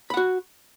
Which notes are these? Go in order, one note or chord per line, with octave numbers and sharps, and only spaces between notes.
F#4 F#5 B5